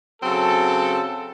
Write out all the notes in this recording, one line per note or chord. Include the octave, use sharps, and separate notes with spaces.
C#3 F#3 C4 A4